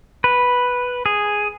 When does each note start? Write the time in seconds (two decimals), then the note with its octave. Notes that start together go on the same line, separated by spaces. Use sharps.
0.24 B4
1.06 G#4